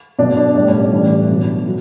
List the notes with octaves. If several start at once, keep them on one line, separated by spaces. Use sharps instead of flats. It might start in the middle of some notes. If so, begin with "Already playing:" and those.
B2 F#3 D4
D4
A2 G3 D4
C#4
D4
A2 E3 G3
B2 F#3
F#3